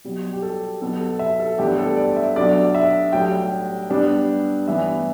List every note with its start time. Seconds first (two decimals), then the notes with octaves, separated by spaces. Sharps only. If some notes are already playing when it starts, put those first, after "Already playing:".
0.05 B1 B2 G3
0.33 G4
0.43 A4
0.81 B1 B2 B3 A4
1.01 A4
1.19 E5
1.40 A4
1.58 A1 G2 G3 B3 D4 G4
1.78 A4
1.96 D5
2.16 E5
2.36 B1 B2 A3 D4 D5
2.75 E5
3.13 B1 A2 G3 G5
3.90 G2 G3 B3 D4
4.67 A1 G2 E3 B3 D4 E5